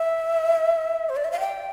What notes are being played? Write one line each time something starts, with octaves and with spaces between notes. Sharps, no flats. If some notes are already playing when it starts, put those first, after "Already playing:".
Already playing: E5
C5
D5
E5
F5
G5